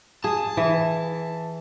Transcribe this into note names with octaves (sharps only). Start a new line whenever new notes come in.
G#4 A5
E3